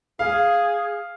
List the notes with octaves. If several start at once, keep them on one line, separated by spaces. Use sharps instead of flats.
G#4 F5